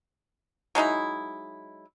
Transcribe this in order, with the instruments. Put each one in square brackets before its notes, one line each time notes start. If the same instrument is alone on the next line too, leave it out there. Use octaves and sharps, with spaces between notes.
[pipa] F#3 G#3 D#4 E4